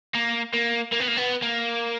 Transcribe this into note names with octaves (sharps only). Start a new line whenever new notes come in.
A#3
A#3
A#3
B3
A#3
B3
A#3